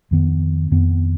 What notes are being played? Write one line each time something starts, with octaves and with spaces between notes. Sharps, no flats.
F2 D#3 B3
F2 D#3 B3